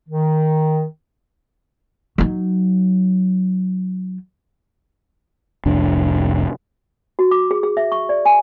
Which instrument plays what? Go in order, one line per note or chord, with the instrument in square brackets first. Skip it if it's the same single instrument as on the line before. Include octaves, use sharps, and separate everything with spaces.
[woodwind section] D#3
[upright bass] F#3 D#4
[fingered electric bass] F1 C2 F2 D4
[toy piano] F#4
D6
G#4
G#4
E5
C#6
D5
G#5